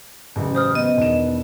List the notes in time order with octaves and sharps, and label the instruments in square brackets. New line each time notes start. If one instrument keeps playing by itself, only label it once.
[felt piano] A1 F#2 C#3
[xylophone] C5 D#6 F6
[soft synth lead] B3 [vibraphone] D#5
[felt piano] E1 D#3 E7